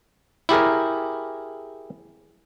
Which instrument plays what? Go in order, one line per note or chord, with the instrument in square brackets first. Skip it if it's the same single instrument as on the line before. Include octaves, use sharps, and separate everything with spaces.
[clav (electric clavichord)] E4 G4 G#4 A#4